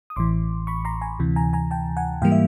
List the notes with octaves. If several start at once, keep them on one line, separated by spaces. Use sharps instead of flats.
D#6
A1 A2 E3 C6 D6
B5 C#6
A#5 C6
G#5 A#5
D2 C3 E3
G#5 A#5
G#5 A#5
G5 A5
F#5 G#5
G#2 E3 G3 A#3 F5 G5
E5